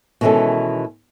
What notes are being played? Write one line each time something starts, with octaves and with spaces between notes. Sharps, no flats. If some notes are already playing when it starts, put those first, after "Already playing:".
B2 D#3 E3 G#3 C#4 A4